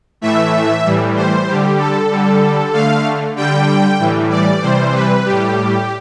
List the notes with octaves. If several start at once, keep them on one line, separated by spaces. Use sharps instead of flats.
A2 E3 A3 E5
A2 E3 G3
C5
D3 G3 G4
A4
D3 G3
D3 A3 F5
D3 G3 G5
A2 E3 G3
D5
C3 E3 G3 C5
B4
A2 G3 G4